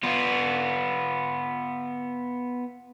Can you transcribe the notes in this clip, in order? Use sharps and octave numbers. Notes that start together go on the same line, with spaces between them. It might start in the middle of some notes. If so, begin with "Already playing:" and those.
B3 F4